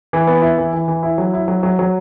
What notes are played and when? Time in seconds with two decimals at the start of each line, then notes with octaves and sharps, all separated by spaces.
0.13 E3
0.27 B3
0.42 E4
0.58 E3
0.73 E3
0.88 E3
1.03 E4
1.18 F#3
1.33 E4
1.48 F#3
1.63 F#3
1.79 F#3